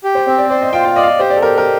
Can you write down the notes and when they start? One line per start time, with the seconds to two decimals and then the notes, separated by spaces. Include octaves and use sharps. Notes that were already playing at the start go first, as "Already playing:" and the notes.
0.04 G4
0.15 C5
0.27 C4 C5
0.38 D5
0.50 C5 D5
0.62 D#5
0.73 F4 G5
0.85 F5
0.96 D5 D#5
1.03 F5
1.08 D#5
1.19 G4 C5
1.30 D5
1.37 A4
1.43 G4 A#4
1.58 A#4